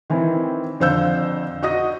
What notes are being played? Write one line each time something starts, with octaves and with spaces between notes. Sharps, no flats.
D#3 E3 C4 E4
F2 D3 C5 F5 E6 G6
F#4 D#5 D#6 A#6